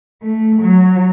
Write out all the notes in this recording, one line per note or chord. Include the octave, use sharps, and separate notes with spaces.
A3
F#3